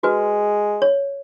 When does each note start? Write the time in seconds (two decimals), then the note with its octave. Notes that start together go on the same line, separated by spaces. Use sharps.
0.03 G#3 F#4 B4
0.82 C#5